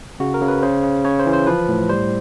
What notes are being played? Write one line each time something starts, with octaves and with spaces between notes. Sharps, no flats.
C#3 F#4
A#4
C#3
B4
C#3 C5
C#3
C#3 C#5
C5
E3
C5
F3 B4
A2
G3 C5